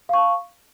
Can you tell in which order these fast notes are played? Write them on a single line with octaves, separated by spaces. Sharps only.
F5 C#6 A5